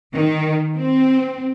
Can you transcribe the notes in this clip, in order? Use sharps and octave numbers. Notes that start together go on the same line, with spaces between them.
D#3
C4